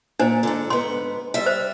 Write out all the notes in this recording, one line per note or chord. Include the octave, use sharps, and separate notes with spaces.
A#2 D4 C5
G#2 D3
G#2 B3 C6
G3 E5
C5